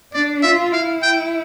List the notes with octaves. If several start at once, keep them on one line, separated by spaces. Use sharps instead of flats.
D4 D5
F4 E5
E4 F5
G5